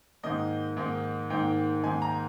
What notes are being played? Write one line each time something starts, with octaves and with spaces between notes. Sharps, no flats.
G#2 D#3 A#3 D#5
G#2 D#3 A#3
G#2 D#3 A#3 G5
G#2 D#3 A#3 G#5
A#5